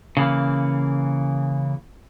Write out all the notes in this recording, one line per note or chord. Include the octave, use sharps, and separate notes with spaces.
C#3 E3 A#3